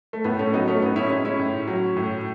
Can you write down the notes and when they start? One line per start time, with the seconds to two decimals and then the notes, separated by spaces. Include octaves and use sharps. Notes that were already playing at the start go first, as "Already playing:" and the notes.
0.13 A3
0.24 A2 B3
0.39 A3 C#4
0.53 F#3 B3 D#4
0.68 A3 C#4
0.82 A2 B3 D#4
0.96 C#4 E4
1.06 D#4
1.10 G#3 C#4 E4
1.25 C#4 E4
1.39 A2
1.67 F#3
1.97 A2